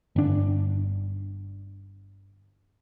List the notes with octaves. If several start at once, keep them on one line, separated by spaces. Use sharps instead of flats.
G1 D4